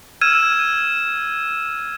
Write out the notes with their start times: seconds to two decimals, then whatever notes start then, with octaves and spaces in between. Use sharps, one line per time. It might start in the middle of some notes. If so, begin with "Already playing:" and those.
0.21 E6 F6 G#6 D#7 E7